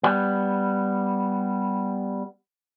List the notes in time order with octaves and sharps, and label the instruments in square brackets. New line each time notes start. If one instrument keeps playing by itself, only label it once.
[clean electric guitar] G3 B3